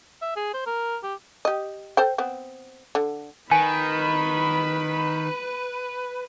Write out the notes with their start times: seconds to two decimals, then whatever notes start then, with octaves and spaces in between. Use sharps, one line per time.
0.21 E5
0.36 G#4
0.54 C5
0.66 A#4
1.03 G4
1.45 G4 D#5
1.97 A4 C5 G5
2.18 B3 C4
2.95 D3
3.52 D#3 B4 G#5 B5